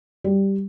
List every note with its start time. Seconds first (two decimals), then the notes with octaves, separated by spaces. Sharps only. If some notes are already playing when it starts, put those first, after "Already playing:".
0.24 G3